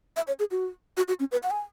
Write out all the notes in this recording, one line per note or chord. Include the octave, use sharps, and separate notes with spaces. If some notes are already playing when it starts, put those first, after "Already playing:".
E5
C#5
G#4
F#4
F#4
F#4
C#4
B4
F#5
G#5